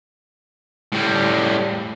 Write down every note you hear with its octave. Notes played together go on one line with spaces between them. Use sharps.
A2 G3